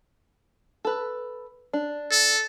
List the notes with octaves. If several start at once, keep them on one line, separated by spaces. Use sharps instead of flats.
A4 B4
D4
A4